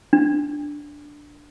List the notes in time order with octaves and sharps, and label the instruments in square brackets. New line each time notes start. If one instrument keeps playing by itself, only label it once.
[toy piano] D4